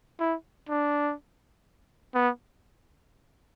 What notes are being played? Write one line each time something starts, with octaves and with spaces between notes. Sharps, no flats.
E4
D4
B3